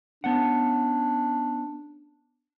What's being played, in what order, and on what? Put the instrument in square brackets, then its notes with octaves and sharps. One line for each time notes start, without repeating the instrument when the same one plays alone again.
[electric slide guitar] B3 C#4 F#5 [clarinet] D4